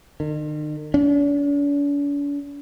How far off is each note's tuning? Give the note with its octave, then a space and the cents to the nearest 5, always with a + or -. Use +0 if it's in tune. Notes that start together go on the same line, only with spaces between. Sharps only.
D#3 -45
D4 -45